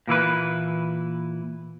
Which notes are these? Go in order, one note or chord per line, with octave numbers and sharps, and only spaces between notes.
A#2 E3 E4 B4